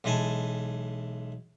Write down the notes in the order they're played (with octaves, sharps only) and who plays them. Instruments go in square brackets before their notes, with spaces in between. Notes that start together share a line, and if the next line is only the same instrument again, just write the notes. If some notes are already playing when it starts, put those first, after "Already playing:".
[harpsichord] B1 E3 G#3 G#5 A5